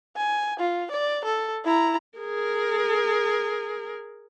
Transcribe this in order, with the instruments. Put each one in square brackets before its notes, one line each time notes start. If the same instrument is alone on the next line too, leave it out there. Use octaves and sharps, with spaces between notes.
[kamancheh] G#5
F4
D5
A4
E4 A#5
[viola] G#4 A#4